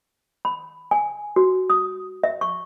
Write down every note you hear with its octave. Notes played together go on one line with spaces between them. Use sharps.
B5
G#5
F#4
D#6
E5
C#6